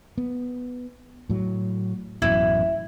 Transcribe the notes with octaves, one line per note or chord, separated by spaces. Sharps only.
B3
A2 F#3
A1 F#2 B2 E4